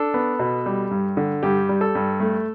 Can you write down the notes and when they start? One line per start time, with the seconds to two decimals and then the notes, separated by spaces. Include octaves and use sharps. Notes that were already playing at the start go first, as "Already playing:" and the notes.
Already playing: D4 A4
0.14 B3
0.39 B2
0.66 G3
0.91 G2
1.17 D3
1.43 G2 G4
1.69 G3
1.81 A4
1.95 G2
2.20 A3